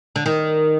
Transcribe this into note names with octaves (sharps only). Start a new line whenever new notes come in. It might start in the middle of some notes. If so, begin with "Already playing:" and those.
D3
D#3